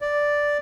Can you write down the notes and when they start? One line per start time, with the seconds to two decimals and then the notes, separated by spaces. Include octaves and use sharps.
0.01 D5